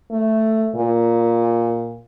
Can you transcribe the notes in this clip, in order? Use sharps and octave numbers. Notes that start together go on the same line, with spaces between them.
A3
A#2